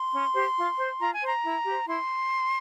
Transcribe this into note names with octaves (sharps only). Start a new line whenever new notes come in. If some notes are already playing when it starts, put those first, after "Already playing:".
Already playing: C6
C#4
G4 C5
F4
C5
F4 A#5
G#5
C5 A#5
E4
G4 C5
E4 C6